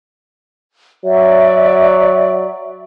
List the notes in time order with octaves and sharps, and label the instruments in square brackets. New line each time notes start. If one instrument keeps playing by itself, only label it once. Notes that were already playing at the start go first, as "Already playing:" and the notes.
[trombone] F#3 [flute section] D5 E5